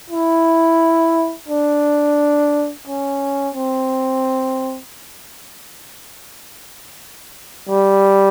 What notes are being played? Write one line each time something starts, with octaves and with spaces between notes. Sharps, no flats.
E4
D4
C#4
C4
G3